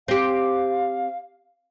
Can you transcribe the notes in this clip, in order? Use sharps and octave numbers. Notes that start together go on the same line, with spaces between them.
C4 G4 F5